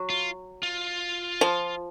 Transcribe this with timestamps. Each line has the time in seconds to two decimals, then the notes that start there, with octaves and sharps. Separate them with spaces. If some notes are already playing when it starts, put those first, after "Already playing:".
Already playing: F#3
0.10 F4
0.63 F4
1.41 F3